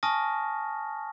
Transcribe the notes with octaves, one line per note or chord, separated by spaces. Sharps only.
G#5 A5 C#6 D#6 F6 A#6